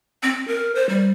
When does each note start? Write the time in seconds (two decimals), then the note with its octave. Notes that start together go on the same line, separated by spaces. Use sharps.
0.23 C4
0.48 A#4
0.75 C5
0.89 G3